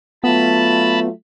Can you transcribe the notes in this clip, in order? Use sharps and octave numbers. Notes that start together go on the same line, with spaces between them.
F#3 A3 B3 F4 A5 B5